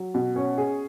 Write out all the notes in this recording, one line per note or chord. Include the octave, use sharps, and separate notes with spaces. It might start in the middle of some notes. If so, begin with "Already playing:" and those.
Already playing: F#3
B2
C#4
G#4